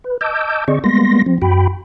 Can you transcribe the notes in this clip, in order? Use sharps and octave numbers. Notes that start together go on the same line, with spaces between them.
B4
D#5 A5 D6 E6 G6
D3 C4 G#4 D5 D#5 C#6
G3 G#3 A#3 B3 C6 A#6
F3 C4
F#2 F#4 G5 B5